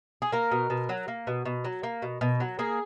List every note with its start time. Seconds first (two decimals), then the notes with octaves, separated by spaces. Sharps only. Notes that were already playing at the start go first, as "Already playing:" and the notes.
0.22 G#4
0.32 A#3 A#4
0.51 B2
0.70 B2
0.89 F#3
1.08 A#3
1.27 B2
1.45 B2
1.64 F#3
1.83 A#3
2.02 B2
2.21 B2
2.40 F#3
2.59 A#3 G#4